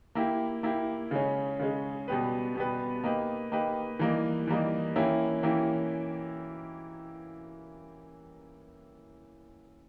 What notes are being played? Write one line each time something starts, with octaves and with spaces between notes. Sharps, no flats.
A#3 E4 G4
A#3 E4 G4
C#3 G#3 C#4
C#3 G#3 C#4
B2 G3 B3 G4 B4
B2 G3 B3 G4 B4
A#3 D#4 G4 B4
A#3 D#4 G4 B4
E3 G3 A#3 D#4
E3 G3 A#3 D#4
E3 A#3 C#4 E4 G4
E3 A#3 C#4 E4 G4